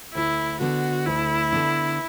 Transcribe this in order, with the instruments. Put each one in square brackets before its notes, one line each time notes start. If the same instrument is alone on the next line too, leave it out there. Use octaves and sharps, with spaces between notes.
[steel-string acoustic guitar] D2 [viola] E4
[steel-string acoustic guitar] D3 B3 D4 [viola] F#4
[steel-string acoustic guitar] D2 [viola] E4
[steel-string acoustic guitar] D3 B3 D4